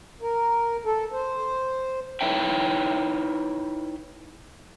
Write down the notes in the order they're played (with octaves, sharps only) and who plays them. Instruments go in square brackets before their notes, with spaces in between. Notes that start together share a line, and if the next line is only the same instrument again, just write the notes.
[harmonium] A#4
A4
C5
[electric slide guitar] D#4 E4 B4 C#5 E5 G5